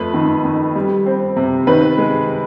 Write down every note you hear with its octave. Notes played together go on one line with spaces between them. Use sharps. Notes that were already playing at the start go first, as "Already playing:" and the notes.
Already playing: F2 A3 B4
D#3
D#3
G3
C4
C3
D#3 B4
G#3